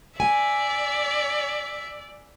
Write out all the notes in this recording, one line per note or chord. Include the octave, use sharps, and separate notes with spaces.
D5 E5 G#5